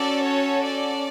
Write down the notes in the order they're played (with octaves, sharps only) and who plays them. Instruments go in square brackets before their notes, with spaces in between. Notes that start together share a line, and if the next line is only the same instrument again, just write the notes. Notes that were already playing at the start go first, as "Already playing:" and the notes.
Already playing: [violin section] C#4 F#4 A4 D5
C#5
D5